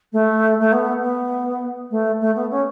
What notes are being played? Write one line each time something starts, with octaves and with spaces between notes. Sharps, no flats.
A3
A3
B3
B3
A3
A3
B3
C#4